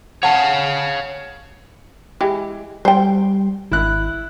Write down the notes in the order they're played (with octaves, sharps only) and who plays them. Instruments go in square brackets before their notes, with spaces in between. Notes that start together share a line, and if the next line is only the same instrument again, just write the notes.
[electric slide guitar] C#5 F5 [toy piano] F#5 A5
[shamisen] E3 G#3 G4
[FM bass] G3 [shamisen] C5 G5
[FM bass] G#1 [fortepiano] E4 F#6